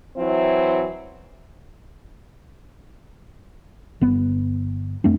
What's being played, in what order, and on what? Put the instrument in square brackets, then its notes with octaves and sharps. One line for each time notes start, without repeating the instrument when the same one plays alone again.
[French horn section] E3 F#3 C4 E4
[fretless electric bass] G1 B3
F2 A3 C4 D4